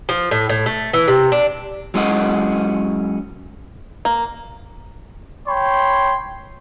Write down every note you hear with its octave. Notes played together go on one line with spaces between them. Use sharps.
F3
A2
A2
A3
E3
C3
D4
F#3 G#3 C#4 E4 D#5 F#5
A#3
C#5 G5 B5 C6